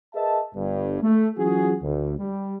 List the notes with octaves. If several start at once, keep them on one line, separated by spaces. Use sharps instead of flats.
G#4 A#4 B4 D#5 E5 A5
G1 G2
A3
E3 F#3 C#4 F4 F#4 G#4
D2
G3